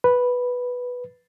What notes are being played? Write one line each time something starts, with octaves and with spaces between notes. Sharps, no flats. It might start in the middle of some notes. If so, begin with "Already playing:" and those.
B4